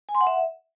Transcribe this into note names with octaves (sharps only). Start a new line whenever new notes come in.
G#5
C6
F#5
E5